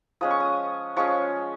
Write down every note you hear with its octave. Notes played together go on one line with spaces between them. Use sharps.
F3 G#3 C#4 D#6
C#6
D#6
F3 G#3 C#4 C#6